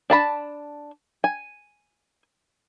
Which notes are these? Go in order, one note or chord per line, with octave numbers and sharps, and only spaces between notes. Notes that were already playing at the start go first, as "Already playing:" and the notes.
D4 A5 B5
G#5